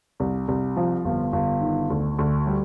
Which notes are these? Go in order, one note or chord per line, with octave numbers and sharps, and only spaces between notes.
C2
C2
F3
G1
G1
D#3
D2
D2
G3